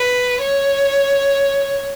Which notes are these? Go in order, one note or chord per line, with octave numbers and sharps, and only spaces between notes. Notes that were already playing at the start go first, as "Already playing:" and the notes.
Already playing: B4
C#5